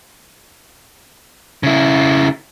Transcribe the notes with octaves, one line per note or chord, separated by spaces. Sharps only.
C#3 E4